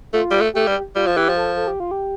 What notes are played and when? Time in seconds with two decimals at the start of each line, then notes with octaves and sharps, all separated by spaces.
0.13 A3 F4
0.31 G3
0.40 A3
0.54 A3 G4
0.67 G3
0.95 G3 F4
1.07 F3
1.16 E3 G4
1.29 F3
1.36 A4
1.57 A4
1.67 G4
1.80 F4
1.91 G4